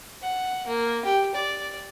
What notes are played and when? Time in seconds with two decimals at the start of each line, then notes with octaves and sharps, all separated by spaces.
0.22 F#5
0.67 A#3
1.05 G4
1.35 D5